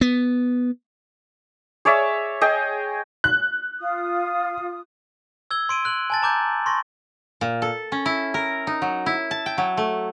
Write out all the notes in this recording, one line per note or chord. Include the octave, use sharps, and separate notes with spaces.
B3
G#4 C#5 D5 E5
G#4 D#5 G5
F#6
F4 D#6
E6 G#6 G7
C6 D7 D#7
F#6 F#7
G#5 A5 A6
A#5 D6 G6
C6 C#6 A#6
A#2
A4
C#4
E4
A#4
D#4
F#3
E4
A5
G5
F#3
A3